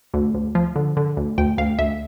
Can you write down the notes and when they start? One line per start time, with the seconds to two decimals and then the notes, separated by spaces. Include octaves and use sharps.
0.14 D2
0.35 D2
0.55 F3
0.76 D3
0.97 D3
1.17 D2
1.38 D2 G5
1.58 D2 F5
1.79 D2 E5